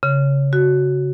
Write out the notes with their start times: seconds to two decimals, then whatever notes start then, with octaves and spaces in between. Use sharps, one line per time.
0.03 C#3
0.53 F#4